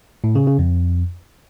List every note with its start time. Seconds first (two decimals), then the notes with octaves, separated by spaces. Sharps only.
0.24 A2
0.35 C#3
0.47 C#3
0.59 F2